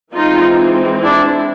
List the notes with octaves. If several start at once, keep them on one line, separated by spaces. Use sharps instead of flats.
E3 G#3 C4 D#4 F4
D4 E4